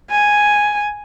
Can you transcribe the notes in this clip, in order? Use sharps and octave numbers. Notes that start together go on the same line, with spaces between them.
G#5